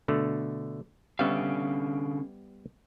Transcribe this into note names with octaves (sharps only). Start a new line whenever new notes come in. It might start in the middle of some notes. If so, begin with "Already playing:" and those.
B2 D3 A3
D3 G3 B3 C#4 E5 F5